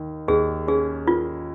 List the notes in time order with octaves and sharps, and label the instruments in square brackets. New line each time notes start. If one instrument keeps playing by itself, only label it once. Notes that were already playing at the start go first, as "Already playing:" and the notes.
Already playing: [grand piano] D#2 D#3
[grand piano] D#2 [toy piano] G#4
[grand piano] C#4 [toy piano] G#4
[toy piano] F4 [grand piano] A#4